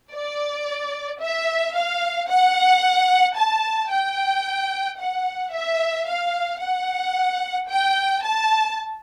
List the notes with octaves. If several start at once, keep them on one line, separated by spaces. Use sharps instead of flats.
D5
E5
F5
F#5
A5
G5
F#5
E5
F5
F#5
G5
A5